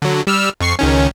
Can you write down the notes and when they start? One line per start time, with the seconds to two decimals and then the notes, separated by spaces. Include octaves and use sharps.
0.02 D3 F#3
0.27 G3 E6 F6
0.61 F2 C#6 C7
0.79 C#2 D#3 C#4